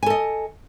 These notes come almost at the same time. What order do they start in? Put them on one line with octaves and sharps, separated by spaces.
G#5 A4 D#5